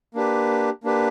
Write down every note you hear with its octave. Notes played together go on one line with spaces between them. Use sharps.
A#3 D4 G4 B4
A#3 D4 G4 B4